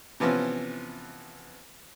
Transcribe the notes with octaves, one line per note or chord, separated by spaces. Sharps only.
C3 E3 F3 B3 C#4